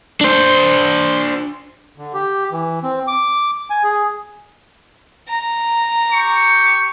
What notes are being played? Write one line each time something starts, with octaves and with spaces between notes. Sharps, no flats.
D4 C5
D3
G4
E3
C4
D6
G#5
G#4
A#5
G4 C#6